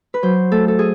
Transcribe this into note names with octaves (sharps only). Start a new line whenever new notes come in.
B4
F#3 C5
A3 A4
A4
G#4